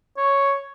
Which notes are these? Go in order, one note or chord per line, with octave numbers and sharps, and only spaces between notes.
C#5